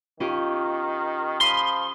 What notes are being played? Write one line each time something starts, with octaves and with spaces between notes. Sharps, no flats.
D#3 C#4 F4 G4
F3 B5 C6 D#6